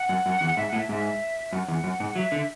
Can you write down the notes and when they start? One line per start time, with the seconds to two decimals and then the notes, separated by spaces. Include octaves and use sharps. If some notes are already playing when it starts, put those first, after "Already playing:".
Already playing: F#5
0.09 F#2
0.26 F#2
0.41 E2
0.57 G#2 E5
0.68 A2 F#5
0.78 E5
0.89 G#2 E5
1.52 F#2 F#5
1.68 E2
1.84 F#2
2.00 G#2
2.16 F#3 E5
2.32 D3